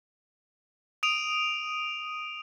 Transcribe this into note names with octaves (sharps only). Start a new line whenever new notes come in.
D#6 D7 D#7 F7